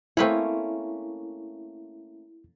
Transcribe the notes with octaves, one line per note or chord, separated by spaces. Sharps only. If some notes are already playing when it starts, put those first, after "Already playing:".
A3 A#3 C4 C#4 E4 B4 C#5